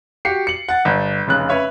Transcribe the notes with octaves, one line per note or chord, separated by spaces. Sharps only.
F#4 G4 C7 C#7
C#7 F#7
F#5 A6
G1
F1 C#3 F#6
C#4 B4 C#5 E5